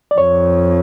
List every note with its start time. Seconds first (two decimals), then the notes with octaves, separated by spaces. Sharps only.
0.11 D5
0.18 F2 C#5